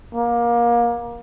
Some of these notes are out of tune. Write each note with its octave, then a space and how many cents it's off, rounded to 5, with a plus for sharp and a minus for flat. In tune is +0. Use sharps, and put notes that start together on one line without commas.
A#3 +25